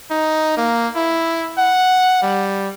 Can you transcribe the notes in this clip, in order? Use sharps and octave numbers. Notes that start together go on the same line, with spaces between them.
D#4
A#3
E4
F#5
G3